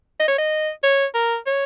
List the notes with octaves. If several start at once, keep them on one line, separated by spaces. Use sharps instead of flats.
D#5
C#5
D#5
C#5
A#4
C#5